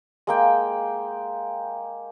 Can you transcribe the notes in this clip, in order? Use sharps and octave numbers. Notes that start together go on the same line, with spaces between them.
G#3 A#3 G5